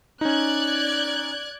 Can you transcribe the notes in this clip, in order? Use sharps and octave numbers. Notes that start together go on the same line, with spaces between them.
C#4 D#4 D5 F#6 G#6